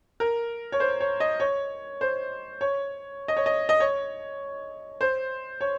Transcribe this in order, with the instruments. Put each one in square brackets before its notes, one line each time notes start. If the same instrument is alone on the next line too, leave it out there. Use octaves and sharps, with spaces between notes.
[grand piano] A#4
C#5
C5
C#5
D#5
C#5
C5
C#5
D#5
C#5
D#5
D#5
C#5
C5
C#5